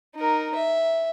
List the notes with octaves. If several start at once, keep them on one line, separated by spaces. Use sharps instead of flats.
D#4 A#4
E5